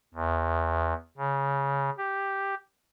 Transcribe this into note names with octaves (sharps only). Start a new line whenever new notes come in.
E2
C#3
G4